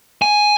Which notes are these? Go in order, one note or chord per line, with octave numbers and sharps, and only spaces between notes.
G#5